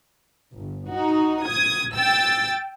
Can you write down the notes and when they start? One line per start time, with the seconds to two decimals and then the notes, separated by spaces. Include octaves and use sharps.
0.53 G1
0.90 D#4 F#4
1.43 D#6 G#6
1.95 G5 E6 A6